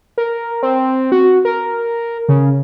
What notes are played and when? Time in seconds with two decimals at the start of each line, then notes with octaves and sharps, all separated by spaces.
0.18 A#4
0.63 C4
1.12 F#4
1.45 A#4
2.29 C#3